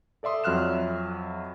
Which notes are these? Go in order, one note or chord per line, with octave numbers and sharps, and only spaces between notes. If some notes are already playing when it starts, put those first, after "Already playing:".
A4 D5 E5 C6 D#6
F2 F#3 E5 F6 F#6 E7